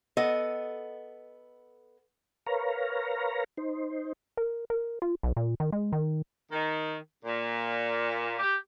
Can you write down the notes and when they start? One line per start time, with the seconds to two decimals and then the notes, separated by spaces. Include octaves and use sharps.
0.17 B3 A4 D#5
2.46 A#4 B4 C#5 F5 A#5
3.57 D#4 C5
4.37 A#4
4.70 A#4
5.02 F4
5.23 B1
5.37 A#2
5.60 D#3
5.72 G#3
5.93 D#3
6.51 D#3
7.24 A#2
8.38 G4